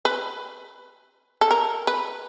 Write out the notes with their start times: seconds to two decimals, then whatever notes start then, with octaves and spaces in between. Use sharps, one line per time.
0.05 B4
1.41 A4
1.51 A#4
1.87 B4